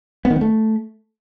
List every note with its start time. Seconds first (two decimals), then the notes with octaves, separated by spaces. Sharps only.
0.25 B3
0.30 D#3
0.36 B3
0.41 A3